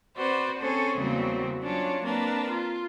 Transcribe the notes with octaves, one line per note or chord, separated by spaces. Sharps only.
C4 F#4 B4 C5 D5
C4 C#4 G#4 A4 C5
E2 C#3 F#3 G3 A#3 C4
F#3 C#4 D4 F4 C#5
A#3 C4 D4 A#4 B4
F4